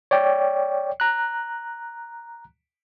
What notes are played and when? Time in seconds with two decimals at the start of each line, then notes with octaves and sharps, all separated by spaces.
0.11 C#5 D5 G5
1.00 A#5 F#6